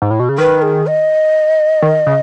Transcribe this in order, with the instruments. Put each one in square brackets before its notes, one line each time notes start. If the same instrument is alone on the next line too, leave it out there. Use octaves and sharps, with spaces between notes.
[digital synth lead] G#2
A2
B2
C#3
[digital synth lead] D#3 [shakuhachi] B4
[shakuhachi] G#4
D#5
[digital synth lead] D#3
C#3